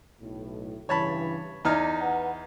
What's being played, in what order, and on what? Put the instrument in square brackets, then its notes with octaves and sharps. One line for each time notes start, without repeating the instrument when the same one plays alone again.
[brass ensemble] B1 A2
[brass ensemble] G2 C#3 E3 [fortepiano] C#5 A5 B5
[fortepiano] E2 D#4 F6 [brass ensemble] D5
[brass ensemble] B4 F#5